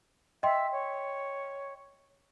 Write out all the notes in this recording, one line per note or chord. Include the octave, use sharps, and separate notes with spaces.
D#5 E5 G5 C6
C#5